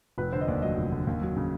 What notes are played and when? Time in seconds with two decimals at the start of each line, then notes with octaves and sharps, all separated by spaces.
0.18 F1 B4
0.33 D3 C5
0.41 D#5
0.48 D#2 D5
0.62 F#3 D#5
0.77 F1
0.92 D3
1.07 D#2
1.22 F#3
1.37 C#3